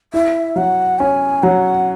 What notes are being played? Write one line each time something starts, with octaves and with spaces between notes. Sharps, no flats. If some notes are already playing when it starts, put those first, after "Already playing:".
E4 E5
F#3 F#5
C#4 G#5
F#3 F#5